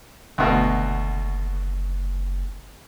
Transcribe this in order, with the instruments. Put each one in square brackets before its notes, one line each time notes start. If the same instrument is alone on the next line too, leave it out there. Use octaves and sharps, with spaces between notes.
[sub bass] F#1 [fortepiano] D2 B2